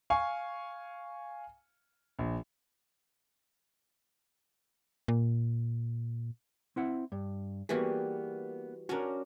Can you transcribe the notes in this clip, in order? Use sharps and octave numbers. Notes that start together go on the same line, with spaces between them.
F5 G#5 C#6
A#1
A#2
C4 E4 F#5
G2
E3 G3 A#3 B3 F#4 G#4
C#4 D4 F#4 A#4